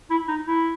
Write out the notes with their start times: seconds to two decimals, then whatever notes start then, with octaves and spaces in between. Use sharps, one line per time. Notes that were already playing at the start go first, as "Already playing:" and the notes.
0.10 E4
0.28 D#4
0.48 E4